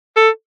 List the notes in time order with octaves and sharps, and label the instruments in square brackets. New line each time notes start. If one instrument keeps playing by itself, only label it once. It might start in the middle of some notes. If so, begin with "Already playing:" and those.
[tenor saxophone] A4